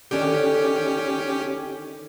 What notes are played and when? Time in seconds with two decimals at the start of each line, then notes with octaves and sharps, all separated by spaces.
0.11 D3 D#3 C#4 G4